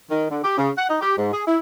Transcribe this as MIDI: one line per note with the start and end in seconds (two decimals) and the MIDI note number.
0.10 0.29 51
0.31 0.44 50
0.44 0.53 67
0.58 0.71 49
0.78 0.89 78
0.90 1.01 63
1.01 1.16 67
1.17 1.31 44
1.33 1.42 68
1.47 1.57 64